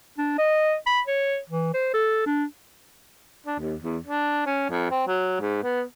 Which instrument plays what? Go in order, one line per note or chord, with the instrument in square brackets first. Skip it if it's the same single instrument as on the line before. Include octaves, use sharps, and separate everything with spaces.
[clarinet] D4
D#5
B5
C#5
E3
C5
A4
D4
[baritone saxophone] D4
D#2
E2
D4
C#4
F2
C4
F#3
G#2
B3